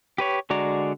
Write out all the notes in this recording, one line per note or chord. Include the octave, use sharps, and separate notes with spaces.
G4 B4 C#5
D3 G#3 F#4 D5 A#5